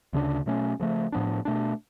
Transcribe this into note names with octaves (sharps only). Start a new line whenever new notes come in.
D2 C#3 G#3 D4
B2 F#3 A3 C#4
C#3 F3 A3
A2 F3 B3 D4
B2 A3 D4